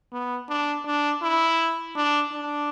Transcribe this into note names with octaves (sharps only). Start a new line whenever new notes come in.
B3
D4
D4
E4
D4
D4